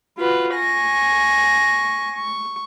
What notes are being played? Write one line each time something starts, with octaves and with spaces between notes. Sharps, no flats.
F4 F#4 B4
G#5 C#6 A#6
C#6